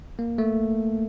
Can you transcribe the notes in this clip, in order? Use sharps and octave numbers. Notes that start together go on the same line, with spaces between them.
A#3
A3